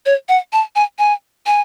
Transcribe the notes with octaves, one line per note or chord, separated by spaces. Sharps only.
C#5
F#5
A5
G#5
G#5
G#5